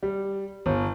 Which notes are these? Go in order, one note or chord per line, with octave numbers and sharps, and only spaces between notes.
G3
G1